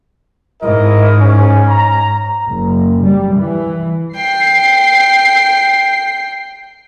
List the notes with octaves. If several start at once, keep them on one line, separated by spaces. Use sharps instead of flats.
G#2 E4 A#4 D#5
C#4
A#5
F#1
G3
E3
G5 C7